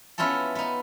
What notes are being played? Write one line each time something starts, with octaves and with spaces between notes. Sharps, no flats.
B3 C#4 E4 F4 A4
B3 D#4